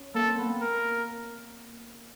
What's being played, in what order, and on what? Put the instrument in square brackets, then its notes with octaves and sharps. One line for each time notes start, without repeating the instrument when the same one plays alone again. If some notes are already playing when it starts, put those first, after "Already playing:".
Already playing: [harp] C#4
[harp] A#3 [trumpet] A4
[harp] C4
B3
A#3
[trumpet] A#4